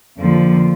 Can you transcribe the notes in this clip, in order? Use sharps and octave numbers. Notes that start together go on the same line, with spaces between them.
F2 D3 F3 A#3